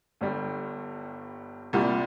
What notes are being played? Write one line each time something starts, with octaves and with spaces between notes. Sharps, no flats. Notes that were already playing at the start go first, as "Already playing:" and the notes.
G1 G2 G3
C2 A#2 G3